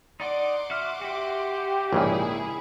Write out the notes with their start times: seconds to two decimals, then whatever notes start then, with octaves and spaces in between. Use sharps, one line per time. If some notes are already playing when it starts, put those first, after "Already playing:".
0.20 D#4 D5 F#5 C6 D6
0.70 F#4 E5 F6
1.02 F#4 G4 E5
1.93 A#1 G#2 C#3 E4 G#4